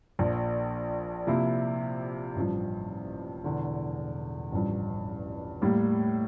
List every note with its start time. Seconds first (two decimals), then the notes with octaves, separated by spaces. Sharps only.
0.19 A#1 A#2 F3
1.27 C3 F3 A#3 E4
2.36 A1 G2 F3
3.44 E1 E2 D3
4.53 A1 G2 F3
5.62 A2 G3 A#3